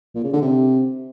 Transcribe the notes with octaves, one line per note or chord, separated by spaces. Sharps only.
A#2
C#3
D3
C3